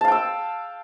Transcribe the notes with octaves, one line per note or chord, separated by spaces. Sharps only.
F5 G5 A5 E6